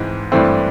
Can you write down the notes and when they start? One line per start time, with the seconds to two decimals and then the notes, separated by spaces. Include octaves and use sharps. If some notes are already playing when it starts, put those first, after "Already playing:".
Already playing: G#2 E3 G#3 C4 D#4
0.32 G2 E3 A3 C4